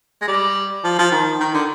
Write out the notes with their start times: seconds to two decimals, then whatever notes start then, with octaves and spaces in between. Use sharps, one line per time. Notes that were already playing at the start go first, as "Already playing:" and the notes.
0.21 G#3
0.28 G3
0.84 F3
0.98 F3
1.11 D#3
1.40 D#3
1.54 D3